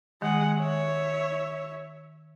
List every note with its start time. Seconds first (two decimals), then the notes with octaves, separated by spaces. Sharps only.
0.22 D#3 G#3 F#5
0.58 C#5 E5